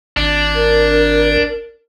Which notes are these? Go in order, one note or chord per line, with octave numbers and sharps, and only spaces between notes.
G#1 D4
A#4